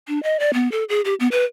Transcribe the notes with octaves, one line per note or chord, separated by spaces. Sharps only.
D4
D#5
D5
B3
A4
G#4
G4
B3
B4